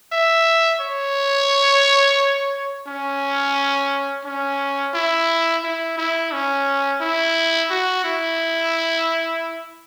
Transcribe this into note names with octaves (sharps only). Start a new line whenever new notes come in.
E5
C#5
C#4
C#4
E4
E4
E4
C#4
E4
F#4
E4